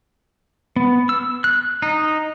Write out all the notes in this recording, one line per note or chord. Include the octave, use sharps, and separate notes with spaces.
B3
E6
F#6
D#4